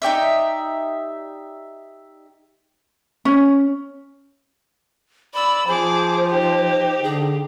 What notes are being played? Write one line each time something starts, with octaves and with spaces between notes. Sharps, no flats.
D#4 G4 D5 E5
C#4
D5 B5 E6
F3 G#4 C5 D6
D#4 G4
D3 G#4